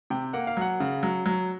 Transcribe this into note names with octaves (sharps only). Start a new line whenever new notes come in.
C3 G5
A#3 F#5
F5
F#3 F#5
C#3
F#3
F#3